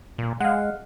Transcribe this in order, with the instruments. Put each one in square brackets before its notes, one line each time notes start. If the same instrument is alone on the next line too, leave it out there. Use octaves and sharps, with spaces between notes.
[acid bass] A#2
[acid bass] G#3 [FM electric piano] F5 F#5